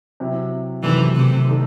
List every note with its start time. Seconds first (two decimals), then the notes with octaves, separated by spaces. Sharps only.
0.20 C3 F#3 C4 E4
0.83 F#2 C3 D#3 E3 A3
1.15 C3 E3
1.47 D#3 A3 D#4 A4